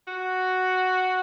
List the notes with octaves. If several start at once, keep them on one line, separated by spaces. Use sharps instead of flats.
F#4